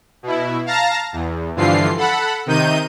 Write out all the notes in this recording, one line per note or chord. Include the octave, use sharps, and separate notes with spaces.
B2 E4
F5 A5 A#5 A#6
E2
G2 D3 E3 F3 F4 C7
A4 F#5 B5
C3 D#3 D#4 G6 D#7